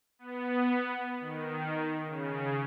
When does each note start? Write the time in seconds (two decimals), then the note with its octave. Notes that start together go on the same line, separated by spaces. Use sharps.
0.19 B3
1.20 D#3
2.05 C#3